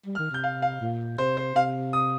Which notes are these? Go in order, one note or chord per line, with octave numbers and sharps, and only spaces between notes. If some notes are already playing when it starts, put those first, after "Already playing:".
G3
F6
D#3
C3 G6
F5
F5
A#2
C3 C5
C5
C3 F5
D#6